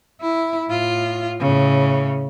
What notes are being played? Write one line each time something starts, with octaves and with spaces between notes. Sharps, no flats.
E4
A2 F4
A2 C#3